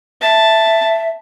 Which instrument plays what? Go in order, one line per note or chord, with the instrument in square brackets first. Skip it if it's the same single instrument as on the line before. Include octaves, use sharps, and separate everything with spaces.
[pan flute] E5 [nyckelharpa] A5